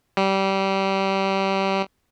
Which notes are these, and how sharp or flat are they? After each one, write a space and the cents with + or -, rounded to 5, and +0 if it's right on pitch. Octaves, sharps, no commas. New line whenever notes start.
G3 -20